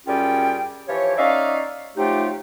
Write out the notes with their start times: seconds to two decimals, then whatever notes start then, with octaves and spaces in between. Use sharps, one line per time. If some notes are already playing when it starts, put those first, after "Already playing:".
0.06 F#2 G3 C#4 F4 G#4 G5
0.88 E3 F3 G4 C#5
1.17 C#4 D#4 D5 E5 F5
1.97 F3 F#3 A3 D#4 F4 G4